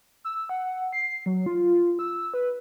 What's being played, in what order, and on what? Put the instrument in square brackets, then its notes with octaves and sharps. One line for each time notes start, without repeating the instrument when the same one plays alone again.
[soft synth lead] E6
F#5
C7
F#3
F4
E6
B4